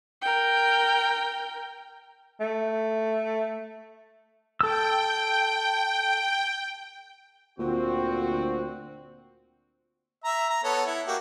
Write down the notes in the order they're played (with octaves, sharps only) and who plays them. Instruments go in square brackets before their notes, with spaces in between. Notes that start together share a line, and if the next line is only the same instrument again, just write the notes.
[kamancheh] A#4 G5
[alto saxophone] A3
[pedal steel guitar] A4 E6 [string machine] G5
[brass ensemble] D2 C4 F#4 [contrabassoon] A#2
[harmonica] E5 A#5
A#5
B3 A4 C#5
E4
A#3 F#4 G4